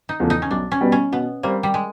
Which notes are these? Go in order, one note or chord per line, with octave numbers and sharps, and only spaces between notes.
D#4
E2 C#3 F3 A3
D#4
C#4
B1 D4
C#4
B2 G3 B3
C#4
B2 B3
G3 A#3 C4
G3
G#3